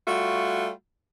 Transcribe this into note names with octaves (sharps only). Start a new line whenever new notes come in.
G3 A3 F4 F#4